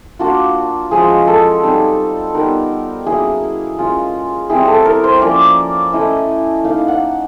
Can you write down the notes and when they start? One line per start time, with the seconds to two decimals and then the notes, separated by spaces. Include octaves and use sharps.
0.19 A#3 D4 F4 F#4
0.91 F3 G#3 C#4 F4 G#4
1.28 A4
1.63 G3 C4 D#4
2.34 G3 B3 D#4 A#4
3.06 F#3 A#3 C#4 E4 G#4
3.79 G#3 C#4 F4
4.50 G3 C4 E4 G#4
4.68 A4
4.85 A#4
5.04 C5
5.21 F3 A#3 C#4 D5
5.93 A3 C#4 E4 D#5
6.64 A#3 D#4 F5
6.88 F#5